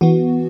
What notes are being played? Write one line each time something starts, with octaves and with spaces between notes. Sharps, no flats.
E3 B3 F#4